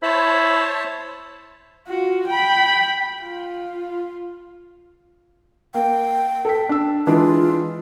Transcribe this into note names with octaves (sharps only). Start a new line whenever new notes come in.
E4 C5 C#5 A5
F4 F#4
G5 B5
F4
A#3 G5
A4 B6
D4 E6
E3 G#3 D4 F4